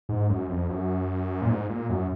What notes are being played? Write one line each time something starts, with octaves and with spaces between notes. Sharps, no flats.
G#2
F#2
F2
F#2
A#2
G#2
A#2
F#2